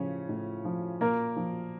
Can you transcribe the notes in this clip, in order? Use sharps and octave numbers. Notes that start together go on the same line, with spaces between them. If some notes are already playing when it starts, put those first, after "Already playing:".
Already playing: A2 C#3 F3 C#4
A2
F3
A#2 A#3 A#4
F3